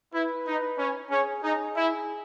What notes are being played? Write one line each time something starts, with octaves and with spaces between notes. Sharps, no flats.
E4 B4
D#4
C#4
C#4 G#4
D#4 G#4
E4